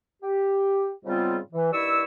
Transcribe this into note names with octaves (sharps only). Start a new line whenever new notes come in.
G4
G#2 C#3 G3 B3 C4 F4
E3
G2 D#3 E4 D5 C#6 E6